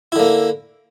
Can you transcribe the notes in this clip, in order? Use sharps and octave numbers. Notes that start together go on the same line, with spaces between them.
D3 A#3 E4